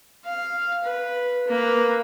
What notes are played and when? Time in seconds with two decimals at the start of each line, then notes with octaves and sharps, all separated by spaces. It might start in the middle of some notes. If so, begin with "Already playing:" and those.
0.25 F5
0.84 B4
1.47 A#3 B4